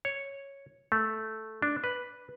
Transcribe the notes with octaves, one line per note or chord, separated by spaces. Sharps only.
C#5
A3
D4
B4